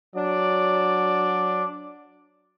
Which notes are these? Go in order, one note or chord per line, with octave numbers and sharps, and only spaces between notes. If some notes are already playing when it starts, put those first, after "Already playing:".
F#3 D4 D5